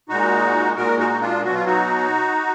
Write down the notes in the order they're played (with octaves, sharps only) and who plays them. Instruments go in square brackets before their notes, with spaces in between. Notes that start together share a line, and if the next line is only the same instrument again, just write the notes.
[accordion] A#2 G#3 D#4 F#4
A#2 G#3 F#4 A#4
D#4 F#4
D#4
D4 F4
B2 F#3 F#4
F4
D#4 F#4